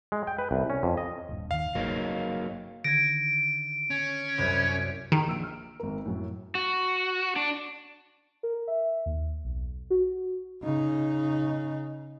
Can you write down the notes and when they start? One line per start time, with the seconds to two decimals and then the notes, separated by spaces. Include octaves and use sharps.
0.12 G#3
0.27 G5
0.39 B4
0.51 C2
0.70 C#4
0.83 F2
0.97 D#5
1.29 D#1 G2
1.51 D#2 D#3 F5
1.75 G1 F#3 A#3 D#4
2.84 D3 D#3 G#6 A#6 D7
3.90 C#4
4.38 C2 F#2 C3
5.12 D#3 G#4
5.27 A#1 E6 D7
5.43 F6
5.80 G#1 A#4
6.05 F#2 A2
6.55 F#4
7.36 D4
8.43 A#4
8.68 E5
9.06 D#2
9.45 B1
9.90 F#4
10.62 C#3 D#4